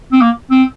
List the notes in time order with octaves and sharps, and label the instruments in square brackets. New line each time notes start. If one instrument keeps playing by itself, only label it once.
[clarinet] C4
A#3
C4